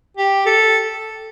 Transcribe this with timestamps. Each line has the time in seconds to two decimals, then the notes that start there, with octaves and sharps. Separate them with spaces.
0.17 G4
0.46 A4